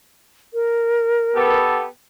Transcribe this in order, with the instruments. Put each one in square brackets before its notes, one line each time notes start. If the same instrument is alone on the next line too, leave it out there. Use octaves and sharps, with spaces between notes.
[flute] A#4
[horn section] B3 G4 A4